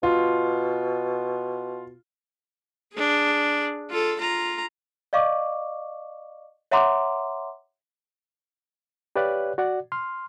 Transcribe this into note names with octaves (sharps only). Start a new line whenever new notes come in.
B2 F4
D4 G#4
F4 A4
F4 A#5
D5 D#5 F5 C#6 D6
C#5 E5 F#5 A#5 C6 D6
G4 B4 C#5 D5 F5 F#6
F#4 D5 F#5
C6 F6